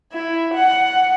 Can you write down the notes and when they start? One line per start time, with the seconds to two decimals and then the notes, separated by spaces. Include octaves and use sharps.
0.13 E4
0.54 F#5